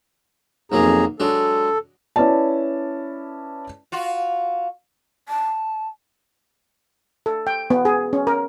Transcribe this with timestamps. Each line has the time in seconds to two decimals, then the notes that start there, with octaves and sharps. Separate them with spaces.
0.72 B1 F2 F#3 A#3 G#4 A#5
1.20 F#3 G#3 D4 A4
2.16 C#4 E4 B4 D5 A5
3.92 F4 F#4
5.29 A5
7.26 A4
7.47 G5
7.70 B3
7.85 G#4
8.13 C#4
8.27 A#4